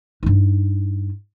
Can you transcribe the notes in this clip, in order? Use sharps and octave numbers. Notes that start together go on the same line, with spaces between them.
G2 D#4